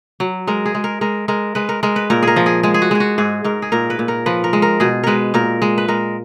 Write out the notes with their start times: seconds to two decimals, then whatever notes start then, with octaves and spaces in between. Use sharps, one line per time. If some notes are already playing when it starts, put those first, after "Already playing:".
0.20 F#3
0.47 G#3 A#4
0.66 G#4
0.75 G#3
0.84 A#4
1.01 G#3 A#4
1.28 G#3 A#4
1.55 G#3 B4
1.69 A#4
1.83 G#3 A#4
1.96 B4
2.10 A#2 A#4
2.23 G#4 A#4
2.36 F3
2.46 G#4
2.63 G#3 G#4
2.74 G#4
2.82 F#4
2.91 G#3 G#4
3.00 F#4
3.18 G#2 G#4
3.44 G#2 A#4
3.62 G#4
3.72 A#2 A#4
3.90 B4
3.99 A#2
4.08 A#4
4.26 F3 B4
4.44 A#4
4.53 G#3
4.62 A#4
4.80 B2 G#4
5.03 G#3 A#4 B4
5.34 A#2 A#4
5.62 G#3
5.78 B4
5.88 G#3 A#4